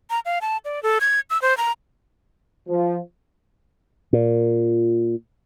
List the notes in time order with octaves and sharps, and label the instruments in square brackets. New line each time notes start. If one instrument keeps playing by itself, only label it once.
[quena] A#5
F5
A5
D5
A4
G#6
E6
C5
A#5
[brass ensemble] F3
[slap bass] A#2